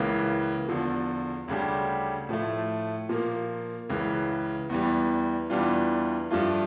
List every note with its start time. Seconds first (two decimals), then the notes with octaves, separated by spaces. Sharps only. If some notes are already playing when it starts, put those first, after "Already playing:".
Already playing: C#2 C#3 E3 A#3
0.69 E2 D3 F3
1.48 D2 C#3 G3 D4 G4
2.29 A2 F3 A3
3.09 A#2 F3 A#3
3.89 C#2 C#3 E3
4.70 E2 E3 G3
5.50 E2 E3 G3 D4 F4
6.31 G2 F3 A3 D4 F4